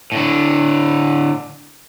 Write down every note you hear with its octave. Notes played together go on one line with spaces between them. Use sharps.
A2 D3